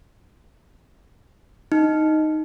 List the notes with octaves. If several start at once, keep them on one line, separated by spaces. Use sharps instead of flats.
D#4